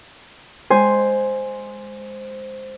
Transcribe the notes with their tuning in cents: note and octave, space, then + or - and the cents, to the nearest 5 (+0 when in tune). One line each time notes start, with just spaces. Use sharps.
G#3 -10 C5 +0 G#5 +0